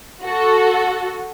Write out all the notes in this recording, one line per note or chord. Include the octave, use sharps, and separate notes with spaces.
F#4 A4